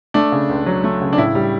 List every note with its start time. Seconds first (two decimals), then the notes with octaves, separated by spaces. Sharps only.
0.14 A3 D4
0.32 C#3
0.49 C#2
0.66 F#3
0.84 A3
1.02 C#3
1.13 D4
1.18 A2 E4
1.35 G3